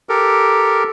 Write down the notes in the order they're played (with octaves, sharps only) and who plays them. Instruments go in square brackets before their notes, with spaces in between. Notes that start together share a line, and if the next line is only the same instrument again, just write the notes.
[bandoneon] G4 A4 A#4